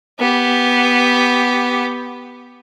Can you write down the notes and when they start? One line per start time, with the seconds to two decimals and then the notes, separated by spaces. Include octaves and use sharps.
0.20 B3 G4